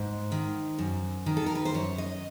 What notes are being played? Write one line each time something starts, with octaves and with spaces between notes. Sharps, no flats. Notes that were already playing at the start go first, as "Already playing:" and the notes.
Already playing: G#2 C5
D#3
F#2
D#3
A4
A#4
B4
C5
F#2 C#5
D#5